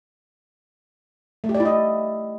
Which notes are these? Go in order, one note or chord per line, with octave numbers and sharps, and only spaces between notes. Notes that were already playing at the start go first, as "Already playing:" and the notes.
A3
G4
D5
E4
D#5